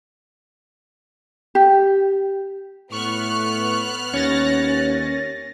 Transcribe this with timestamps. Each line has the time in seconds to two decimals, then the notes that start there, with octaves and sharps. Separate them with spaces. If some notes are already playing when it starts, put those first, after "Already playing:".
1.55 G4
2.92 A2 B3 C#6 F6 F#6
4.14 D#2 C#4 C#5 A6 A#6